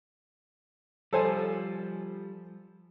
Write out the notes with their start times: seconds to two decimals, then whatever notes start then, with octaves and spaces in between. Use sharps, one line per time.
1.13 F3 G3 A4 C5 G#5